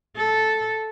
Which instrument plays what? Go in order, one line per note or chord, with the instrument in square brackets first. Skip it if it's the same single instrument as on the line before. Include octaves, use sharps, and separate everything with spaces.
[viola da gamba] A4